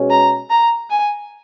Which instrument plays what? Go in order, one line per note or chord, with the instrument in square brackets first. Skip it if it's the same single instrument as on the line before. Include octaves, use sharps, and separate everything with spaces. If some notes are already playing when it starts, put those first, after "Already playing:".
Already playing: [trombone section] B2 G#3 C#4
[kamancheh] A#5
A#5
G#5